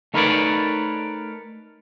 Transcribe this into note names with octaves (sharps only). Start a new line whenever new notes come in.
A3 D#4 A#4 B4 C#5 D5